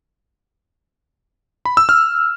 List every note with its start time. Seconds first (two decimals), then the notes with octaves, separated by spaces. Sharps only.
1.65 B5
1.77 E6
1.89 F6